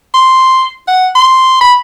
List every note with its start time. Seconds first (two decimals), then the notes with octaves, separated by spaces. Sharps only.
0.14 C6
0.87 F#5
1.15 C6
1.61 B5